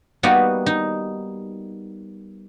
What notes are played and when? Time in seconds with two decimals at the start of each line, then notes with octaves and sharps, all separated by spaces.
0.23 G3 A#3 B3 D#4 F#4
0.66 D#4